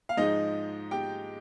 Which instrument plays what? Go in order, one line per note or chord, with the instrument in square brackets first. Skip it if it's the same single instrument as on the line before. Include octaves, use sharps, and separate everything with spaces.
[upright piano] F5
G#2 F3 G#3 D#4 D#5
G4 G5